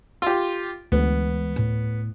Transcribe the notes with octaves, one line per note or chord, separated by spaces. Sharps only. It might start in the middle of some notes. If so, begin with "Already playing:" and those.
F4 G4
D2 E3 G#3 B3
A2